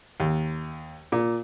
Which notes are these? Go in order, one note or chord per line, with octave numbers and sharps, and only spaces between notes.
D#2
A#2